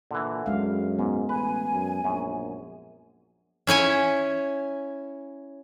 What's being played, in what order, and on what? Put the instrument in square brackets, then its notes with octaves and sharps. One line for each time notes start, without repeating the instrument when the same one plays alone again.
[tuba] A#2 [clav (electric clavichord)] D3 E3
[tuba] F#2 [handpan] G#3 F5
[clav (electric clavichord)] G#2 [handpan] B3
[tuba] A1 [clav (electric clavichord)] B4 [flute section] G#5
[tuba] F#2
[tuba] A#1 [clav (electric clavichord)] F#2
[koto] C#4 E4 C#5 G#5